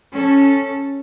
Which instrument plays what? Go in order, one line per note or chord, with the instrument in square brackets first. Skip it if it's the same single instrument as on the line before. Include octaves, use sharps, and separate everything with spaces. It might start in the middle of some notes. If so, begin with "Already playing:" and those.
[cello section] C#4 A4